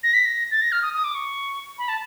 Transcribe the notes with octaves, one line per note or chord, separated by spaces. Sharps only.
A#6
B6
A#6
A6
A#6
F6
D#6
D#6
D6
C#6
B5
A5